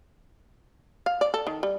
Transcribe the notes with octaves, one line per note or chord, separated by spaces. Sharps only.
F5
D5
A4
D#3
G3